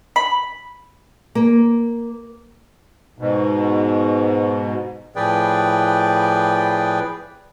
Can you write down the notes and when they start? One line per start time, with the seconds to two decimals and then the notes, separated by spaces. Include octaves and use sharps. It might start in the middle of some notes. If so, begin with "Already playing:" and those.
0.16 B5
1.35 A#3
3.19 G#2 B2
5.16 A2 F3 G#4 B4 D5 G5